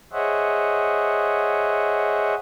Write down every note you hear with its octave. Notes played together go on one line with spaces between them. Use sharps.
G#4 C5 C#5 D#5 E5 F#5